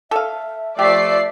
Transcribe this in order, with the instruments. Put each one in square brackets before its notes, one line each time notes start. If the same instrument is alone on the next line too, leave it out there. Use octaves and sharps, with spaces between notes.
[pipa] A4 F5 [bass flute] E5
[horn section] F3 A3 [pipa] G4 [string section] D5 C7 [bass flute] E5